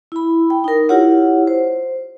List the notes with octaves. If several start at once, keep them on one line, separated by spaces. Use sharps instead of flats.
E4 B5
G5
D#4 A#4
E4 F4 G4 C#5 F#5
C5